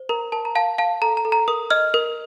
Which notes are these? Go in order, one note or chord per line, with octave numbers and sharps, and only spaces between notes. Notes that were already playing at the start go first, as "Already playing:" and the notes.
Already playing: C5
A#4 A#5
A#4 A5
A#5
F5 A5
F5 A5
A4 A#5
A#5
A4
A#5
A#4 D#6
D#5 F6
A#4